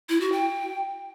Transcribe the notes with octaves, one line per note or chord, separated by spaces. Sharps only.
E4
F#4
G5